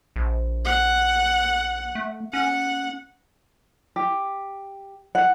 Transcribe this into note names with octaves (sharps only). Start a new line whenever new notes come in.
A#1
F#5
A3
C#4 F#5
G4
F#5